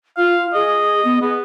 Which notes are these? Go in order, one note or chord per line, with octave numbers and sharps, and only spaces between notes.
F4 F5
G#4 D#5
B3
B3 G#4